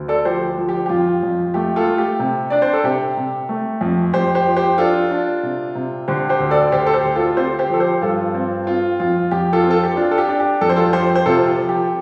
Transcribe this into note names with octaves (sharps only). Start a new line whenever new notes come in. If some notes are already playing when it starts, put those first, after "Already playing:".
Already playing: D2
A4 D5
F3 G4 C5
F3
G4
G4
F2 F4
F2
A3 G4
F4 A4
A3
G4
C3
D4 D5
C5
A4
C3 G4
C3
A3
F2
F2 G4 C5
G4 C5
F3
G4 C5
D4 F4 A4
D4
C3
C3
D3 G4 C5
G4 C5
D2
A4 D5
D2 G4 C5
A4
G4 C5
D2
F4 A4
C4 G4 C5
G4 C5
F3 A4
G4 C5
G2 F4 A4
C4
C4 F4
F2 F4
F2 G4
F4 A4
C4
A4
G4
D4 F4
A4
G4
D4
G4
F2 A4
C5
F4 A4
F3 G4 C5
C5
C3 F4 A4
G4
F3
G4